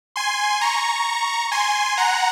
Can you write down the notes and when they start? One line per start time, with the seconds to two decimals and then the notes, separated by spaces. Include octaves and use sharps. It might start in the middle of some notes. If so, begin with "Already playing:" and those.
0.16 G#5 C6
0.61 A#5 C#6
1.52 G#5 C6
1.97 F#5 A#5